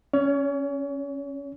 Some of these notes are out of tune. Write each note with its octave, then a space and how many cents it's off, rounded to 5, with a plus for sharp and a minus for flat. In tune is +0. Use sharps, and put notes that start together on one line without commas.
C#4 +0 C#5 +35